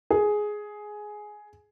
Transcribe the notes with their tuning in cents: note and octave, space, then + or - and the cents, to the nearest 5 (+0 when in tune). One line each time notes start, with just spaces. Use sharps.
G#4 +10